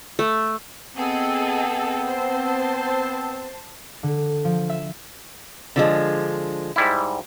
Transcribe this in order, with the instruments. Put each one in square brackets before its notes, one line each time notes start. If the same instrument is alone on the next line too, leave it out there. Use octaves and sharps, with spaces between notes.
[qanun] A3
[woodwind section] B3 C4 [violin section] G#4 A4 D#5
[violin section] C5 A5
[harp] D3
F3
E5
[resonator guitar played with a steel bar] D3 F3 G#3
[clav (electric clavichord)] G#2 G3 E4